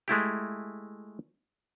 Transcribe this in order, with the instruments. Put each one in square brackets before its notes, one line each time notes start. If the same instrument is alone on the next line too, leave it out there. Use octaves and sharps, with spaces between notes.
[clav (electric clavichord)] G#3 A3 E4 G4